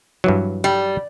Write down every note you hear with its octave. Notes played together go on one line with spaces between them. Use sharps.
G2 E3 F#3
G3